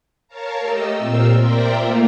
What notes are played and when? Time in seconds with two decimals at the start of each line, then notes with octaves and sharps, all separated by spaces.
0.28 A#4 C#5 F5 A5 A#5
0.60 A3 G4 D#5 E6
0.97 A#2 C4 F4 A#4 E6
1.37 A#4 C5 D5 E5 G5 A#5
1.73 A3 A#3 F4